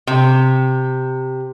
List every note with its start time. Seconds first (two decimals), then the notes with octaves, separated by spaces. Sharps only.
0.07 C3